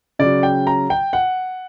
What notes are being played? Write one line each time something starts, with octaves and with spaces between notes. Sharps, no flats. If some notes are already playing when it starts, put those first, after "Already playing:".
C#3 F#3 D5
G5
A#5
G5
F#5